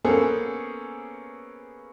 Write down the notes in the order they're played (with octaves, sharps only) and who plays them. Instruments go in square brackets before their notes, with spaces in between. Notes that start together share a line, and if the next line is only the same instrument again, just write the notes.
[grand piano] A#3 B3 C#4 G#4 A4 C5